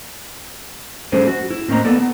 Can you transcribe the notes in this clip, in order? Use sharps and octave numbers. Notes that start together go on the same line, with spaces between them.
F#3 G#3 C#4 G#4 A4 C5
F#4
E4
A2 A#3 C4 C#4 D#5 A#5
A#3 B3 A4 D5
B3